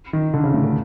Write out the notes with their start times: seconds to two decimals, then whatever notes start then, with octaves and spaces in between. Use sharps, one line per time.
0.13 D#3
0.34 D3
0.44 C#3
0.54 A2
0.64 D3